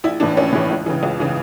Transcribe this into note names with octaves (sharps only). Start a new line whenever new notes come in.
A#1 E4
A2 E3 D4
A#1 C#4
A2 E3
C#2
C#3 E3
C#2
C#3 E3